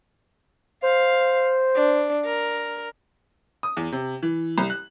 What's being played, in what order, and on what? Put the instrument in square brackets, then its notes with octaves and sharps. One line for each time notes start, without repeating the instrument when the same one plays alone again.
[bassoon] C5 [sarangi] F5
[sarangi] D4
A#4
[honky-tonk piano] D#6
E2
C3
E3
C2
F#6